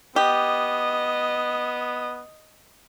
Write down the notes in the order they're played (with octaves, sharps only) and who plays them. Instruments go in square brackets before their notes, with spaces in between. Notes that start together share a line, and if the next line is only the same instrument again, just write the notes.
[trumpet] B3 [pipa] G4 [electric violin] D#5